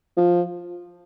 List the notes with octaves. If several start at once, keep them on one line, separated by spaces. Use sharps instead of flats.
F3